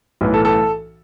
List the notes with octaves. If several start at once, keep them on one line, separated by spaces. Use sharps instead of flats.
B1 A2 E3
A4
A4